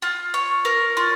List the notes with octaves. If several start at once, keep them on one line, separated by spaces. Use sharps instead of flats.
F4
C#5
A#4
F4